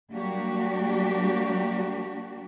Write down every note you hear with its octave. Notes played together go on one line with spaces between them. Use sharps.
F#3 G3 A#3 D4 F#4 G4